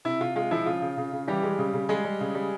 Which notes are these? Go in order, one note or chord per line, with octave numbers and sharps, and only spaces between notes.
C3 E4
C3 F4
G#3 F4
F3 E4
C#3 F4
C#3
C#3
C#3
E3 G3 G4
G#3
C#3
C#3
G3 G#3 G#4
G3
C#3
G3